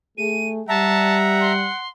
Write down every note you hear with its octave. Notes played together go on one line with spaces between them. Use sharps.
A3 G#4 D#7
G3 E5 F#5 A5 A#5
C6